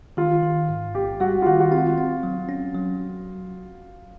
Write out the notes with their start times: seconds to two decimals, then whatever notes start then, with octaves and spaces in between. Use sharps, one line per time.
0.17 D#3 F4
0.43 D#3
0.69 G#2
0.95 A1 G4
1.20 G3 F#4
1.42 F4
1.46 D#3 F#4
1.60 F#4
1.71 C4 F4
1.98 C4
2.23 F#3
2.49 C#4
2.75 F#3